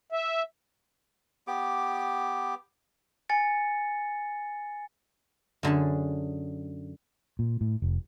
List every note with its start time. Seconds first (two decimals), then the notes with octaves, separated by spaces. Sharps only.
0.12 E5
1.47 B3 G4 D6
3.29 G#5 A6 C#7
5.63 F#2 D3 G#4 A5
7.39 A#2
7.61 A2
7.82 F1